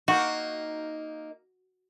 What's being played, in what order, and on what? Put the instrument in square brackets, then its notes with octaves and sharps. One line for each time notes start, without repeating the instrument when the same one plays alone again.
[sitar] A#3 D#4 [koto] F#4